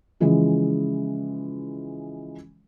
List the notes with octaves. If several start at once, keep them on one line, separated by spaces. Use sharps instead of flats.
C#3 E3 F3 G#3